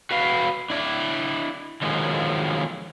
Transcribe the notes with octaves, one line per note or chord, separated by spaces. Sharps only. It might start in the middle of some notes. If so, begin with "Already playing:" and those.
F#4 B4 F5
D4 E4 D5
D3 D#3 F3 F#3 G#3